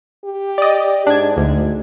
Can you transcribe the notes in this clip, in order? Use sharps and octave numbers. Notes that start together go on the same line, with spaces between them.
G4
D5 D#5
G#2 D4 G#6
D2